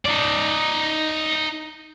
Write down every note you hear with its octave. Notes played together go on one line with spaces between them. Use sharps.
D#4 D5